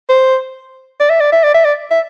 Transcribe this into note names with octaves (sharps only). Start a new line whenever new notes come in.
C5
D5
E5
D5
E5
D5
E5
D5
E5